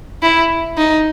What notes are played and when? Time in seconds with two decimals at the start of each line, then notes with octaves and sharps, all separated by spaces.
0.23 E4
0.77 D#4